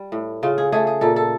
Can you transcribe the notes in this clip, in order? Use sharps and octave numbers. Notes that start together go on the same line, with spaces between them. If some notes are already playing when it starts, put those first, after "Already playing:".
Already playing: G3
A2
C#3 F4
G#4
A3 G#4
G#4
A#2 A4
A4